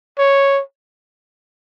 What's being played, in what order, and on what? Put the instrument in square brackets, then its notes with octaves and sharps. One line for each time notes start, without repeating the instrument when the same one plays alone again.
[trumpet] C#5